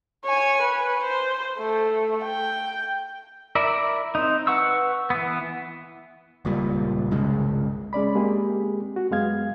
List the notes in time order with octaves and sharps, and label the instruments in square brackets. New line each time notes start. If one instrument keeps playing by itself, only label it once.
[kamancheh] C#5 G#5
B4
C5
A3
G5
[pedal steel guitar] E4 A#4 D5 E5
C4 D#4
B4 F#5 C#6 E6
E3 B3
[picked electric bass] D#1 C#2 A#2 G3
G1 C2 C#3 G#3
[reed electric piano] G#3 C#4 D5 B5
G#3 A#3 C4 G4 G#4
F#4
F#2 G#3 B3 F5 G#6